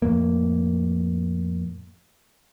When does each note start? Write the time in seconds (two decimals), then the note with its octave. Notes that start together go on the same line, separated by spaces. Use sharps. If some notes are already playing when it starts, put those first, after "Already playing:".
0.02 F2 A2 A#3